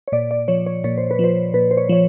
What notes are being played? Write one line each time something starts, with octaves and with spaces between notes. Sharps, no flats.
C#5
A#2 D5
D5
F3 C#5
C#5
A#2 C#5
C5
B4
F3
C5
A#2 B4
C5
C#5
F3 C#5